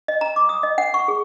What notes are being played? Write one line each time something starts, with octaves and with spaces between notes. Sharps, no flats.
D#5
A#5
D6
D#6
D#5
F#5
C#6
G#4